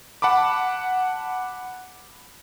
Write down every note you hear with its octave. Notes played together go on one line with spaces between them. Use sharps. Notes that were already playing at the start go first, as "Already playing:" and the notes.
F#5 A5 B5 D6